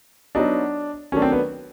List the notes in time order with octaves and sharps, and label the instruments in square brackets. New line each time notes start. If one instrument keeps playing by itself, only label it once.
[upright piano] F#3 B3 D#4 F#4 [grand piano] D4
[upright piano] D#3 F#3 A3 D4 [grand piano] C#4
[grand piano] C4
B3